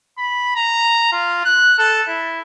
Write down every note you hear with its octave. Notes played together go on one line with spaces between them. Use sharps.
B5
A#5
F4
F#6
A4
E4